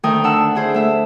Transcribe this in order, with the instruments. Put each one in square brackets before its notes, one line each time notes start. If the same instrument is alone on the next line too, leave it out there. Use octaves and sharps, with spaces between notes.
[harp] D2 D#3 A3 A#4 G5 D#6
D4 F#5 A5 E6
D4 E4 G#4 C5
A3 E5